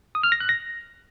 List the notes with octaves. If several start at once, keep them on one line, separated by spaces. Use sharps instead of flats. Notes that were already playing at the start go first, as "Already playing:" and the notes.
D#6
F6
A#6
F#6
A#6